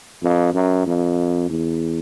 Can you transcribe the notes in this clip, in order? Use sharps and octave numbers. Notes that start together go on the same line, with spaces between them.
F2
F#2
F2
E2